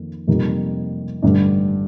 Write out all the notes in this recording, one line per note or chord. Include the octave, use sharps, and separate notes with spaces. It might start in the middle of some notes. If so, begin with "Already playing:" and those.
Already playing: F2 D#3 A#3
F2 C3 G3 A#3 D#4
A1 G2 D3 G3 D4